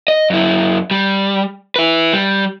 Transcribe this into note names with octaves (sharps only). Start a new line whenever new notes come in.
D#5
F#2 E4
G3
E4 B4
G3